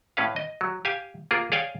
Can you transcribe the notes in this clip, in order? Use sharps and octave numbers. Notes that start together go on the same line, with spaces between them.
A2 C#4 B4 F5
D#5
F#3
G4 F5 G#5
A#3 F4 G#4 A#4
G#4 C#5 D5 F5 G5 G#5